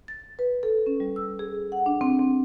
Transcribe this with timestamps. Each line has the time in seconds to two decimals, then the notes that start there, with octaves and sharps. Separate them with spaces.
0.08 A6
0.39 B4
0.63 A4
0.87 C#4
1.00 G3
1.16 E6
1.39 G#4
1.72 F#5
1.86 D4
2.01 C4
2.19 C4